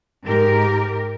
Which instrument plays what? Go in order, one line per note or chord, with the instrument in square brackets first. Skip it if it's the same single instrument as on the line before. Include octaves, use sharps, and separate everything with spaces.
[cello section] G#2 G4 A#4